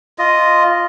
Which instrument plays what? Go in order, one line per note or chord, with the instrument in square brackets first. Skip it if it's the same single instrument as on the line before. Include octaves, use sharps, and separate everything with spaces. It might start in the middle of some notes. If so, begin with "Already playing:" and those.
[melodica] F4 D#5